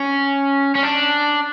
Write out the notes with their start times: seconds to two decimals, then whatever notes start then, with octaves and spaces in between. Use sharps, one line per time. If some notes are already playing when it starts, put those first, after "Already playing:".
Already playing: C#4
0.75 C#4
0.83 D4